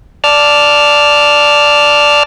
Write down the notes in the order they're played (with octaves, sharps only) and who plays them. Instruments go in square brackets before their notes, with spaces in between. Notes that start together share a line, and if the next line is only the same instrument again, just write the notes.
[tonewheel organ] D5 A5 F6